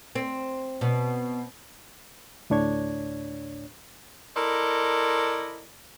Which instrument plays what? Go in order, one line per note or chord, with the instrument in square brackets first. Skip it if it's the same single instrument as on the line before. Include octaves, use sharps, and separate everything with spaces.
[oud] C4
B2
[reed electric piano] D2 A2 D4 C#5 G#6
[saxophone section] E4 A4 A#4 C5 D5 D#5